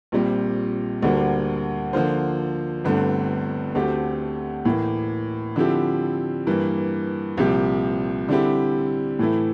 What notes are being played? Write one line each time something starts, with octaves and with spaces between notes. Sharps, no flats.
A#1 A#2 G3 C4
D2 D3 G3 A#3
D3 F3 A#3 F4 C5
G1 G2 D3 A3 C4
D2 D3 A3 C4 G4
A2 E3 A#3
D3 F3 C4 E4 G4
G2 E3 A#3
C2 A#2 F3 C4 G4
D3 G3 C4 E4 G4
A2 E3 A3 E4